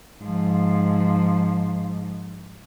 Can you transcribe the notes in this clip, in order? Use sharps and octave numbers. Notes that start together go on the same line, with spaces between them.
G#2 F3